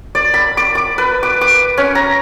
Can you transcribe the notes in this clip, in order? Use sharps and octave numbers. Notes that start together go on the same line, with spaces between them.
D5
B5
D6
D6
B4
D6
D6
C#4
A#5